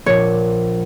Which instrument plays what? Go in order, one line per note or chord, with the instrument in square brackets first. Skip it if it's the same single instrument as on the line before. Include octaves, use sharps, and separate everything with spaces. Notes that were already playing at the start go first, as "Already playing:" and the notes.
[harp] A#1 A#2 [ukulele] C#5